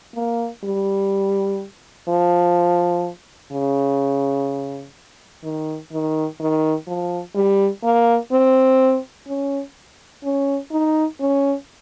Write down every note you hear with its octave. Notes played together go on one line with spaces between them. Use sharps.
A#3
G3
F3
C#3
D#3
D#3
D#3
F3
G3
A#3
C4
C#4
C#4
D#4
C#4